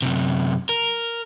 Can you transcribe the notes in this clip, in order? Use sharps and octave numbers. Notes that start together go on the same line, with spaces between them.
F#2 C3
A#4